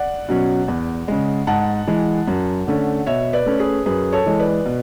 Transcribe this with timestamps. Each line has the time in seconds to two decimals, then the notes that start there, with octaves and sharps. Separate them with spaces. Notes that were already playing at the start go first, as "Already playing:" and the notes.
Already playing: D5 F#5
0.28 B2 F#3 C#4
0.68 E2
1.08 C#3 G#3
1.47 G#2 F#5 A5
1.87 E3 G#3
2.28 F#2
2.67 D3 A3 C#4
3.06 B2 C#5 E5
3.33 B4 D5
3.46 A3 C#4
3.59 G#4 B4
3.86 F#2 G#4 B4
4.13 A4 C#5
4.26 E3 G#3
4.40 B4 D5
4.65 B2